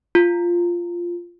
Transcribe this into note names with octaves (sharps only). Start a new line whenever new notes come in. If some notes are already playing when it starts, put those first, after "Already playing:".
F4